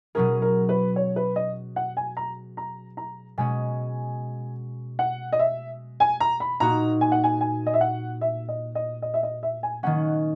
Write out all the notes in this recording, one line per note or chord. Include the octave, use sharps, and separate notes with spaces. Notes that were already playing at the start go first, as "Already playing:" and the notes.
B2 F#3 C#4 G#4 A#4
A#4
B4
C#5
B4
D#5
F#5
G#5
A#5
A#5
A#5
B2 G#3 C#4 G#5
F#5
D#5
E5
G#5
A#5
B5
A#2 A#3 D#4 F#4 A#5
G#5
F#5
G#5
G#5
D#5
E5
F#5
E5
D#5
D#5
D#5
E5
D#5
E5
G#5
D#3 A#3 C#4 F#5